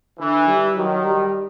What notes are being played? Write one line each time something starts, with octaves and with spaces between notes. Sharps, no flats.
D3 E3
G3
D#3 F#3
G3